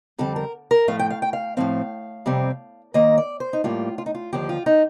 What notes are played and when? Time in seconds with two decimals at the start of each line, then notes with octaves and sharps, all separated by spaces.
0.18 F2 D3 G3 C4 A4
0.36 A#4
0.71 A#4
0.88 A2 F3 A3 F5
0.99 G5
1.10 F5
1.22 G5
1.33 F5
1.57 A2 F3 C4 F5
2.26 F2 C3 G3 C4
2.94 D#2 D#3 A#3 D#5
3.18 D5
3.40 C5
3.53 D#4
3.64 A2 G3 A#3 F4
3.98 F4
4.06 D#4
4.15 F4
4.32 D#2 D3 F3 G4
4.49 F4
4.66 D#4